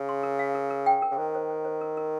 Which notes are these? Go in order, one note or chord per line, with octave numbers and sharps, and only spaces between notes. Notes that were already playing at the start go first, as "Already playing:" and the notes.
Already playing: C#3
C6
A#4
F5
A#4
A#4
G5
A#4
C#3
D#3 C5
C5
C5
C5
A#4
A#4